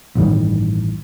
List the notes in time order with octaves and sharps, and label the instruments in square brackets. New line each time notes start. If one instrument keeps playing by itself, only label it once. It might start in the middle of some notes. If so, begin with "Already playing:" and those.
[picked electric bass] A1 G2 D#3 G3